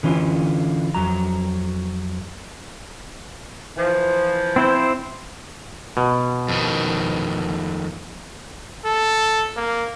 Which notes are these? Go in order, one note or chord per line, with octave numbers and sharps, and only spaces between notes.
D3 E3 C#4 F4
F2 F#3 A#5
E3 F3
C4 E4 C5
B2
F2 D#3
A4
A#3